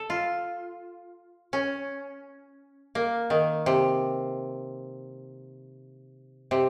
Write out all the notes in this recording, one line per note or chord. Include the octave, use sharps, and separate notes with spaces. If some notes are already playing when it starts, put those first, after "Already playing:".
Already playing: A4
F4
C#4
A#3
D#3
C3
C3